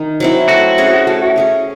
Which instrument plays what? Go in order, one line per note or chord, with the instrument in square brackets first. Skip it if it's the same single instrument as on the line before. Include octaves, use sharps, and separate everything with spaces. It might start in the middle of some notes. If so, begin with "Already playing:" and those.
Already playing: [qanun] D#3
F#3 C4 E4
[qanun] A3 [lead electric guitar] F#4
[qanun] C#4 G#4 C#5
A3
C#4 G#4 C#5